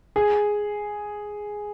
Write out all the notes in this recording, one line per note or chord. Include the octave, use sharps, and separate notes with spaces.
G#4